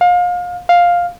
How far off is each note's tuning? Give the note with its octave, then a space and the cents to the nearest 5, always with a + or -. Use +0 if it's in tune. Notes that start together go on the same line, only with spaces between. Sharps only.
F5 +30
F5 +5